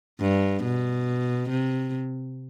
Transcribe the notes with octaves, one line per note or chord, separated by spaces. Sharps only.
G2
B2
C3